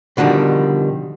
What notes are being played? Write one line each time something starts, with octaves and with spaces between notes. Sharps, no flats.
B2 D3 D#3 F3 G3